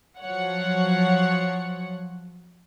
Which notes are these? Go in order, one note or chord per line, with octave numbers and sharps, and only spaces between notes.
F3 F#3 C#5 F#5